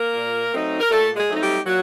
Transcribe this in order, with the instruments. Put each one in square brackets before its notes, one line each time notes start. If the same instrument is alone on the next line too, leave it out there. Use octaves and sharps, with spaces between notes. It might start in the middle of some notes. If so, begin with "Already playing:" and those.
Already playing: [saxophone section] A#3 A#4
A#2
F#3 A3 C4 D#4
A#4
A#2 A3 A4
G#3 G#4
F#3 A3 C4 D#4
G3 G4
A#2 F#3 F#4